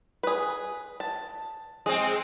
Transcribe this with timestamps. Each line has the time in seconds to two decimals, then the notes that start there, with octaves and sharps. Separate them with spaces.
0.23 G#4 B4
1.00 A5
1.86 G#3 C4 G#4